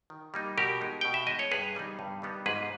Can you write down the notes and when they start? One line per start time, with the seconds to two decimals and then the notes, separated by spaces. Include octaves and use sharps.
0.10 D#3
0.34 G3 A#3 D#4
0.57 B2 G4 A#4
0.81 G#3 D#4
1.01 B2 G5
1.14 E5
1.27 G#3 D#4 D#5
1.39 C#5
1.51 G2 G#4 B4
1.75 D#3 G3 B3 D#4
1.99 G2
2.22 D#3 G3 B3 D#4
2.46 G#2 G#4 B4